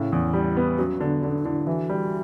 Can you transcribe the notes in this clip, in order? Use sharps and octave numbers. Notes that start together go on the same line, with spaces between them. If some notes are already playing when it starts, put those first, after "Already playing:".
Already playing: A2 C#3 E4
E2
G3
B3
F#3 C#4
D3 B3
D3 C#4
D4
D3 E4
E3 F#4
G3